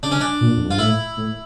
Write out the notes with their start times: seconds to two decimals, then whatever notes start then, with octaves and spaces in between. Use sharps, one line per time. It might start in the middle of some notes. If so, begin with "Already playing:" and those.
0.03 C#3 D4
0.12 C#4
0.21 D4
0.41 A#2
0.56 F2
0.68 G2 F4
0.78 A2 E4
1.17 A2